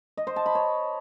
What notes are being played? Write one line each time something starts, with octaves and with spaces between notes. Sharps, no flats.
D#5
C5
A5
B5
C#5